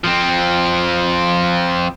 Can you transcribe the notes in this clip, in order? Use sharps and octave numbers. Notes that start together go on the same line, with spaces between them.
F3 C4